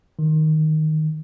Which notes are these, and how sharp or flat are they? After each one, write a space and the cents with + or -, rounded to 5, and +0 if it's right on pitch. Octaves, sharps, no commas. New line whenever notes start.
D#3 +0